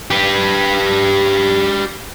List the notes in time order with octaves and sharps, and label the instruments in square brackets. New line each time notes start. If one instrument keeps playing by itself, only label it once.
[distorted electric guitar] G4 B4